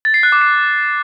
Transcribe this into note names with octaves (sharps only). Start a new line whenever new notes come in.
A6
C7
F#6
D6
C7